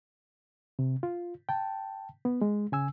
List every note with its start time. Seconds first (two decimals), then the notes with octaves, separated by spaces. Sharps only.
0.79 C3
1.03 F4
1.49 G5 A5
2.25 B3
2.42 G#3
2.72 C#3 G#5 E6